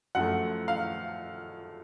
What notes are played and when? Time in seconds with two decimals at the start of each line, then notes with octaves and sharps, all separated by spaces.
0.15 F#2 F3 A3 F#5
0.68 F5